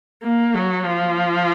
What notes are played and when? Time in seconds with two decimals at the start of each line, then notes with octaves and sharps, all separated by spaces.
0.23 A#3
0.54 F#3
0.84 F3